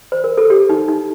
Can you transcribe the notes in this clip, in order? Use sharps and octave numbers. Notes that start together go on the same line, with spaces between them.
C5
A#4
A4
G4
D#4
D#4